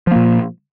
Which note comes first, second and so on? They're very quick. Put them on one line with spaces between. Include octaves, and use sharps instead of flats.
F3 A#3 A#2